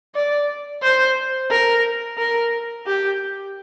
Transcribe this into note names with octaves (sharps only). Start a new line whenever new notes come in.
D5
C5
A#4
A#4
G4